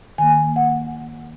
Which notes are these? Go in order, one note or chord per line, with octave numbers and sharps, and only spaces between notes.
D#3 A#3 G#5
F#5